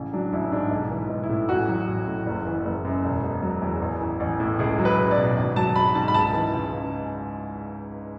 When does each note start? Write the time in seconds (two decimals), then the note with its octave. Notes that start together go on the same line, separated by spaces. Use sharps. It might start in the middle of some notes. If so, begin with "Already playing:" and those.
Already playing: A1 C#3
0.13 F#3 D4
0.33 A1 E4
0.52 G#2 D4
0.71 B1
0.90 E3
1.10 B1
1.23 E4
1.29 A2
1.49 A1 F#4
1.68 F#3
1.88 A1
2.07 A2
2.26 F#1
2.46 E3
2.65 F#1
2.85 F#2
3.04 E1
3.23 B2
3.43 F#3
3.62 E2
3.82 A1
4.01 E3
4.20 A1
4.40 A2
4.59 C#2 G#4
4.79 F#3
4.85 B4
4.98 C#2
5.11 D5
5.17 B2
5.36 G#1
5.56 F#3 A5
5.75 G#1 B5
5.95 G#2 A5
6.08 B5
6.14 C#2 A5
6.33 E3
6.53 C#2
6.73 C#3